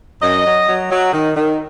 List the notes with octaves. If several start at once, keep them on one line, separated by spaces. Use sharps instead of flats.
F#2 D#5
F#3
F#3
F#3
D#3
D#3